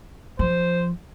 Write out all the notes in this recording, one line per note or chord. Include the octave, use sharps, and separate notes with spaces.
F3 C5